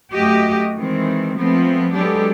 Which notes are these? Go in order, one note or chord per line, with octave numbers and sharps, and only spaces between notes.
F#2 A3 F#4 G4 D#5
D#3 E3 G#3 C4
F3 G#3 A3 B3 C4
F#3 G#3 B3 D4 G4 A4